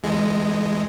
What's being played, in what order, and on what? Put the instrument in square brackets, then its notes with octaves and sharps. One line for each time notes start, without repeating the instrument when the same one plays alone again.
[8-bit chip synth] E2 G#3